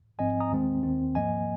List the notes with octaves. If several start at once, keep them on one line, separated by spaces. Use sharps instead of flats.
G#1 G#2 F3 C4 D#5 G#5
A#5 D#6
D#2 D#3 G#3 C4
D#2 D#3 C4
G#2 F3 A#3 D#5 G#5